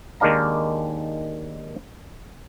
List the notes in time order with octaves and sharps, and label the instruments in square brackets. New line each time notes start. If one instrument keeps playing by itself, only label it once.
[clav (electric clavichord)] D#2 D#3 G#3 D4 F5 A#5